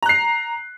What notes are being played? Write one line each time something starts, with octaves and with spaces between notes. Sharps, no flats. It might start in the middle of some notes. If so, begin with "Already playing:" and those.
A#5 F#6 C7